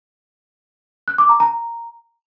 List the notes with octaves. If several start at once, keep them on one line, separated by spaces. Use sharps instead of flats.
F#6
D6
A#5
A#5